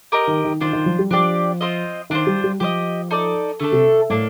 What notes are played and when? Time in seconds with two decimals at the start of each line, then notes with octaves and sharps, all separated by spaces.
0.12 G4 A#4 D#5
0.27 D#3
0.44 D#3
0.61 D#3 D4 F4 C5
0.73 D#3
0.86 F3
0.99 G3
1.11 F3 D4 G4 D5
1.61 C4 F4 C5 D#5
2.10 D#3 D4 F4 C5
2.27 G3
2.44 G3
2.60 F3 G4 C5 D#5
3.11 D#4 A4 D5
3.60 D3 A3 D4 A4
3.72 C3
4.10 A2 A#3 D4 A4